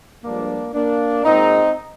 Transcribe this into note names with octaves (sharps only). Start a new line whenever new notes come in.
G2 F3 G#3 A#3 D4
A#3 D4
A#2 G#3 C4 D#4